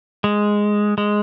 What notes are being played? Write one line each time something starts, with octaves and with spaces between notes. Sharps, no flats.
G#3
G#3